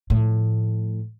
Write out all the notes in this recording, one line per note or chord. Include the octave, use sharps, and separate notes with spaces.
A2 F3